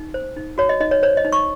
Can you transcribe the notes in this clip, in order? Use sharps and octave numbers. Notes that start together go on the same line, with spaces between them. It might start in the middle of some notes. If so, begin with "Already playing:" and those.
Already playing: D#4
C5
D#4
F#4 C#5
D#5
D#4 D#5
C#5
C5 C#5
D#5
D#4
C#6